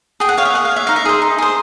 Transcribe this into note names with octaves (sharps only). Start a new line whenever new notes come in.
G#4 G5
F#5
C#5 F5
E5
G#4 F#5
F5
C#5 E5
D#4 F5
E5
G#4 C5
D#4
G#4 C5